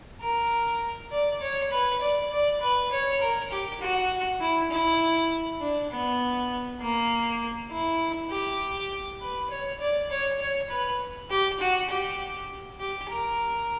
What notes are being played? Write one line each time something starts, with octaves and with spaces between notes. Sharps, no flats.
A#4
D5
C#5
B4
D5
D5
B4
C#5
A#4
G4
F#4
E4
E4
D4
B3
A#3
E4
G4
B4
C#5
D5
C#5
C#5
B4
G4
F#4
G4
G4
A#4